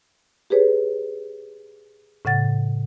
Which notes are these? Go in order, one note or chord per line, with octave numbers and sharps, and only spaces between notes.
G4 G#4 B4 C#5
A2 C#3 F#5 A6